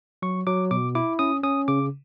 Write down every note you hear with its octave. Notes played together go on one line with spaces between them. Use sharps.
F#3 C#6
F#3 D6
B2 D6
E4 D6
C#4 D#6
C#4 D#6
C#3 D6